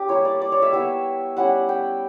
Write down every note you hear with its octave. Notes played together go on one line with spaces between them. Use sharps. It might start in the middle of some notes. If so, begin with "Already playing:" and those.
Already playing: C#4 G4
G3 A#3 E4 C#5
D5
D5
C#5
E5
G3 B3 E4 E5
G3 C#4 E4 F#5
G5